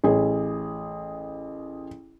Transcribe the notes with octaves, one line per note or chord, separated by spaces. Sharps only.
A1 G#4